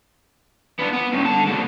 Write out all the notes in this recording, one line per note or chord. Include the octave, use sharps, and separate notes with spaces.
B3 D4
B3
G2 C#3
D3 A5
G#2 B2